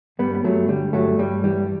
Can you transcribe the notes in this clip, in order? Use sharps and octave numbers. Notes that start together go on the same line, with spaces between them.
G2 G3 B3
B3
G2 F#3 A3
D3 G3
G2 F#3 A3
G2 G3
E3 G3